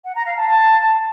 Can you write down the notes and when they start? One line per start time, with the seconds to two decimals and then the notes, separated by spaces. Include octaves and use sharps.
0.05 F#5
0.15 A#5
0.26 F5
0.37 A5
0.47 A5